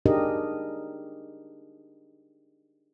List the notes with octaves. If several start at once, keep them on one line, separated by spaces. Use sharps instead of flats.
D4 D#4 G4 G#4 A#4 D#5